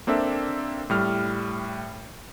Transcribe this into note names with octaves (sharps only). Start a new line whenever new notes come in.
A#3 C4 D4 A4 E5
A2 G3 F6